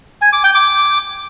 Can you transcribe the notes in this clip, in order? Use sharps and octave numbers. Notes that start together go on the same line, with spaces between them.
G#5
D6
G5
D6